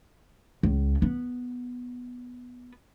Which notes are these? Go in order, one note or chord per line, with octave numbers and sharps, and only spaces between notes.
C#2
B3